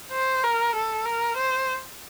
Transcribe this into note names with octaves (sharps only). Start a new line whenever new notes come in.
C5
A#4
A4
A#4
C5